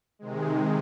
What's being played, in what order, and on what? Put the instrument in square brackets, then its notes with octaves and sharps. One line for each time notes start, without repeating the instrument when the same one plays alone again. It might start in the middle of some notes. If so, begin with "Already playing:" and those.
[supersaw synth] C3 D#3 G#3